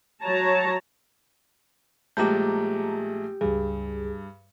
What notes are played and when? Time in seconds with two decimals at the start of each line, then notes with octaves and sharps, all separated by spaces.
0.22 F#3 F#4 C#5 A5 A#5
2.17 A#1 G#3 A3 G4 A5 A#5 D6 G6
3.41 C#2 G2 G#4